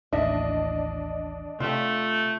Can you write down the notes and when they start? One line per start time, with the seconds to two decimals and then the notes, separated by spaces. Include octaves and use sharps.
0.13 A1 D#2 A2 D4 D#5 E5
1.60 C3 A3 F4 G4